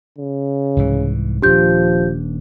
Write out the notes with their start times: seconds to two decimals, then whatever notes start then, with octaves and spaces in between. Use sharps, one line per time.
0.18 C#3
0.76 C2 G#2 E3
1.42 D#1 F3 D4 G4 G6